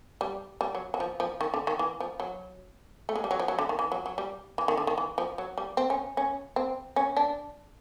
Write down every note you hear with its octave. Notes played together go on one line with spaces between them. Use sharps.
G3
G3
F#3
F#3
F3
F3
D#3
D3
D#3
E3
F3
F#3
A3
G#3
G3
F#3
F3
F#3
D3
D#3
E3
F#3
F#3
G3
E3
D#3
D3
D#3
E3
F3
F#3
G3
C4
C#4
C#4
C4
C#4
D4